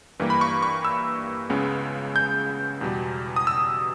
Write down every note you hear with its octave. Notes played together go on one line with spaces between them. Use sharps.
G2 E3 G3 A#3
B5
C#6
C#6
E6
C#2 C#3 G#3 B3
G6
E2 B2 G3
D#6
E6